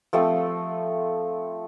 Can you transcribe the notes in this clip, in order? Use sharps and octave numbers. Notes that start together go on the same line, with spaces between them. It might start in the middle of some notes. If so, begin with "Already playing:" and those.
F3 A3 C4